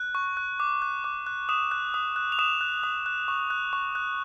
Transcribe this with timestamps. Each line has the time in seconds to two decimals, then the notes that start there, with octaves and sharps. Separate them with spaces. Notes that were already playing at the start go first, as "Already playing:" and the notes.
Already playing: F#6
0.15 C#6
0.37 F#6
0.60 D6
0.82 F#6
1.04 D6
1.27 F#6
1.49 D#6 E7
1.71 F#6
1.94 D#6
2.16 F#6
2.32 F7
2.39 D#6 E7
2.61 F#6
2.84 D#6
3.06 F#6
3.28 C#6
3.50 F#6
3.73 C#6
3.95 F#6